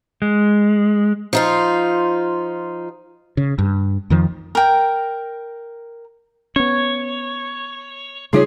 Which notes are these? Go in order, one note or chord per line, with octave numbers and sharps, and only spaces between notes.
G#3
F3 D#4 F4
C#3
G2
F2 D#3 F3
A#4 G5
B3 C#4 C#5
C#3 G3 A3 D#4 F4 G#4 C#5